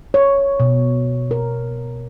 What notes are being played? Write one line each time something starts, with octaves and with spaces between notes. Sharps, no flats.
C#5
B2
A#4